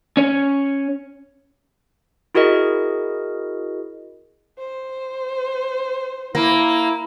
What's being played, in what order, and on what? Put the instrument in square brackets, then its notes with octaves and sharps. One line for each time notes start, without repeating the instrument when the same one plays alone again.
[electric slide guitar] C#4 C#5
[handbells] E4 F#4 G#4 A#4 D#5
[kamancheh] C5
[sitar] A#3 [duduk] E4